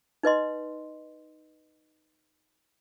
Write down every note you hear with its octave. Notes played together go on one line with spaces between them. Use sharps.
D#4 B4 D#5 C6